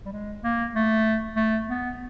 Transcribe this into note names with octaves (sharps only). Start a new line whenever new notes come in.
G3
G#3
A#3
A3
A3
B3